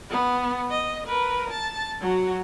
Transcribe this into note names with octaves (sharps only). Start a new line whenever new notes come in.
B3
D#5
A#4 B4
A5
F#3 F#4